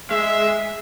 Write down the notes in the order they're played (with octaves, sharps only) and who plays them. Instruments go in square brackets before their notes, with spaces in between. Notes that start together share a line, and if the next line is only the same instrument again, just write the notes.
[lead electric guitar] G#3 [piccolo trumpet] E5